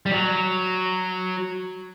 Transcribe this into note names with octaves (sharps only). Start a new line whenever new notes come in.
G3
F#3